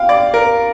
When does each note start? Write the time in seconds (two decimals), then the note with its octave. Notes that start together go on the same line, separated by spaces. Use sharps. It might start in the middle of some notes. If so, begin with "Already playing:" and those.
Already playing: F5 G5
0.09 D5
0.34 A#4